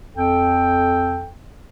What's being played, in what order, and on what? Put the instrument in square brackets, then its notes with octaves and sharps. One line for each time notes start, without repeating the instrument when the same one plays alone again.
[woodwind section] F2 A4 G5